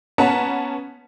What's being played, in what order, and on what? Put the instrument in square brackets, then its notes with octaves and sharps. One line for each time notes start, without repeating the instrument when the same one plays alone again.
[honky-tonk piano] B3 C#4 F#5 A5 A#5 B6